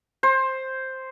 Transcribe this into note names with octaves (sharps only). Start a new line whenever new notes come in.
C5